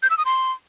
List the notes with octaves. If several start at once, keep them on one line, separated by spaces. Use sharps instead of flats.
G6
E6
D#6
C6